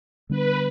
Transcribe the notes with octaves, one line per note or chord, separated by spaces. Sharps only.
D3 G3 B3 D4 B4